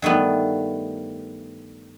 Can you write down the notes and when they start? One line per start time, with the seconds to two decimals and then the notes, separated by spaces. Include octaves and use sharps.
0.02 G2 D#3 A3 B3